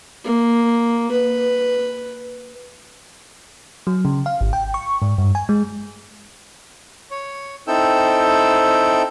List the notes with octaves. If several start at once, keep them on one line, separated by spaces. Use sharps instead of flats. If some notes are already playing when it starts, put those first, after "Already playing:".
A#3
B4
F#3
C#3
F5
G#1
G5
C#6
G#2
G2
G#5
G#3
C#5
C4 D#4 E4 A4 G5 E6